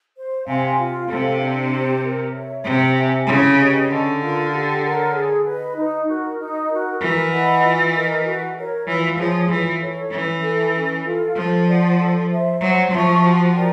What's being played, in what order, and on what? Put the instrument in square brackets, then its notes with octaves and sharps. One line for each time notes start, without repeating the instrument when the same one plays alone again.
[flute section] C5
[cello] C3 [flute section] F5 G#5 C6
[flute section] F4
[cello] C3 [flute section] A4 C5 F5
[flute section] D4
G4 C5
A#4
C#5 E5
[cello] C3 [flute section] C5
[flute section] E5 G#5
[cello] C#3 [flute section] E4
[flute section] G4 B4 D#5
[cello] D3 [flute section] C#4
[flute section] F4 A#4
G4
A#4 C#5 F#5
G#4
B4 D#5
D#4
F#4 A#4
D#4
F#4 A#4
[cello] E3 [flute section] A#4
[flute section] D#5 F#5 B5
F4
A#4 D#5
F#4
A#4 C#5
[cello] E3 [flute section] F4
[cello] F3 [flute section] G#4 C#5
[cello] E3 [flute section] F4
[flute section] A4 C#5
[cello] E3 [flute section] C#4
[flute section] E4 A4
C#4
F4 A4
[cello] F3 [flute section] A4
[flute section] D5 F#5
A4
C5 E5
[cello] F#3 [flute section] C5
[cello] F3 [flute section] E5 A5 C#6
[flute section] F#4
A#4 D5 G5